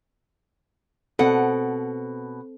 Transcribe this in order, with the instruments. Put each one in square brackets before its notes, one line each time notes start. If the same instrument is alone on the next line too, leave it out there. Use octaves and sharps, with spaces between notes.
[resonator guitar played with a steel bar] B2 F#5 [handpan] C4 A4